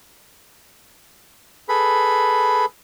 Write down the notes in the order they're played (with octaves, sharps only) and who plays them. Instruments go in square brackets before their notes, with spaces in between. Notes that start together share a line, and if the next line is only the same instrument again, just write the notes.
[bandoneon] G#4 A4 B4 B5